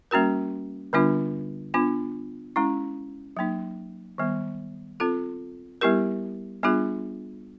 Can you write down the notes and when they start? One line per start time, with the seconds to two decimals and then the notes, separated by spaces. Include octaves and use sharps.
0.11 G3 A#3 C#4 F#4 A#4
0.93 D3 G3 B3 D4 F4
1.74 B3 D4 F4
2.56 G#3 C#4 E4
3.37 F#3 A#3 D#4
4.18 D#3 G3 B3
5.00 C4 F4 A4
5.81 G3 B3 E4 G4 A#4
6.63 G3 B3 D4 F4 G#4